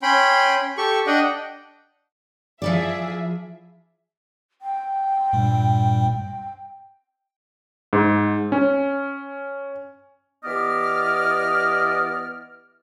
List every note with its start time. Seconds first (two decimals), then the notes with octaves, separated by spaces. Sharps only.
0.02 C#4 G5 B5 C6
0.77 G4 A4 C#6
1.07 D4 D#5 F#5 G5
2.62 F3 E4 G#4 D5 E5
4.62 G5
5.33 G2 A#2 G3
7.93 G#2
8.52 C#4
10.44 E3 B3 G4 D5 D#5 F6